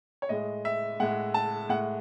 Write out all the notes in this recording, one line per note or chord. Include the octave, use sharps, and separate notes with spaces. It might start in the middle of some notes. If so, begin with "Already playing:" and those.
C#5
A2 G#3 D#5
E5
A2 G#3 F#5
A5
A2 G#3 F#5